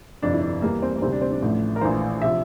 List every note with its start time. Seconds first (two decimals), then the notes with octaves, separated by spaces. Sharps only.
0.22 G1 F2 C3 D4
0.33 E4
0.42 D4
0.62 E2 E3 G3 A#3
0.82 C4
0.95 A#3
1.02 D2 C3 G3 C4
1.12 D4
1.22 C4
1.32 D4
1.42 A1 A2 F3 A3
1.76 A#4
1.81 A#1 A2 E3 C5
2.22 C3 F3 E5